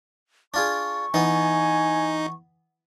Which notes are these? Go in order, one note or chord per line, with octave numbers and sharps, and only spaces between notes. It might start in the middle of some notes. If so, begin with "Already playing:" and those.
D4 F4 G#4 C#6
E3 B3 D#4 G#5